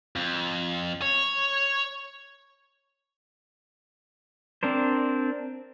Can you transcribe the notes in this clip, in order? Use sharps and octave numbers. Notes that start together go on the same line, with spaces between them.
F2
C#5
C4 D4 A#4 C5